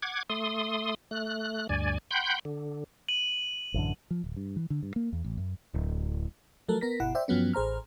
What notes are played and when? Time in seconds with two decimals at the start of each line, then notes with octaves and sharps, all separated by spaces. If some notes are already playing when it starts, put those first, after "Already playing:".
0.02 F#5 D6 G#6
0.30 A3 C6 D#6
1.11 A3 F#6
1.69 D2 G2 D5 G#5
2.11 F#5 G5 B5 C6 G6
2.45 D3
3.08 D#7 F#7
3.74 A1 F#2 D3
4.11 F3
4.24 D1
4.36 G2
4.56 E3
4.70 D3
4.83 G2
4.96 A#3
5.13 E2
5.25 A1
5.37 F#2
5.74 D1
6.69 F3 F#3 A3 A4 A#4
6.81 B3 A#4 A#6 B6
7.00 G1 B2 E4 F#5
7.15 C5 D5 E5 G5
7.28 G2 F3 F#3 B3 C#4
7.53 A1 G#4 C5 A#5 F6